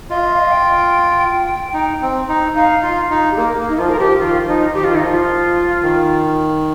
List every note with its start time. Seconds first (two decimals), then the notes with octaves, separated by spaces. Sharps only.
0.10 F4 D#5
0.17 F5
0.25 D#5
0.32 F5
0.40 D#5
0.51 G5
1.74 D#4
2.02 C4
2.29 D#4
2.55 D#4 F5
2.83 F4
3.10 D#4
3.31 G4
3.37 A#3 A#4
3.59 A#3
3.68 D#4
3.78 F3 F4
3.90 A#4
3.99 F3 G4
4.19 D#3 F4
4.47 F3 D#4
4.74 D#3 G4
4.84 F4
4.91 D#3 D#4
5.01 F3 F4
5.83 D#3